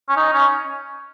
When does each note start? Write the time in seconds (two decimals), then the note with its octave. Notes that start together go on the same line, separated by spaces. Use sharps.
0.09 C#4
0.17 D#4
0.34 C#4